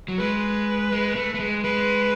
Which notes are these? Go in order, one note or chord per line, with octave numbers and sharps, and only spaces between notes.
F#3
G#3 B4
G#3
A3
A3
G#3
G#3 B4